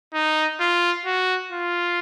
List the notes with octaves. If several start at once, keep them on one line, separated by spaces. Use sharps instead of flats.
D#4
F4
F#4
F4